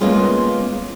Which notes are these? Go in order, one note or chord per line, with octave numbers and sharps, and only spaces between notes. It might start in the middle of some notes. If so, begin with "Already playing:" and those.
G#3 A#3 B3 C#4 F4 G#4